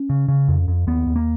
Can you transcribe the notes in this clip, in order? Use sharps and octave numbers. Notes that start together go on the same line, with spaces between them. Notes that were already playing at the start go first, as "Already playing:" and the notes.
Already playing: C#4
C#3
C#3
F2
F2
D#2 B3
D#2
A#3